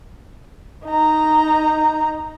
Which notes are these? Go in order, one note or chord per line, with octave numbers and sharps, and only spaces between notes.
D#4 A#5